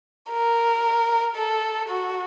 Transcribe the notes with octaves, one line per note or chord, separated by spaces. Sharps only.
A#4
A4
F#4